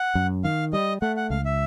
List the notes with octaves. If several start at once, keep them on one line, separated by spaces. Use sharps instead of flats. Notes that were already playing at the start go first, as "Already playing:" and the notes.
Already playing: F#5
F#2
D#3 F5
G3 D#5
A3 F#5
F#5
C#2 F5
E5